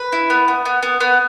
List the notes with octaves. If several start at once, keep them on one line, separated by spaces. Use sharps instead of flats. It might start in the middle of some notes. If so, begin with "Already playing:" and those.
Already playing: B4
E4
B3
B3
B3
B3
B3